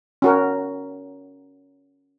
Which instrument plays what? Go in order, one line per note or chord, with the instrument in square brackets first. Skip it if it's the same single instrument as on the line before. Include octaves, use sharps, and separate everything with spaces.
[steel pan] C#4 F#4 A#4